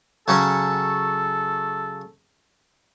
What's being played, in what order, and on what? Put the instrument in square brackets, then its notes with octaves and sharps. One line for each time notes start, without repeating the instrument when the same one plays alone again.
[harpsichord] C#3 F#3 C#4 [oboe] A4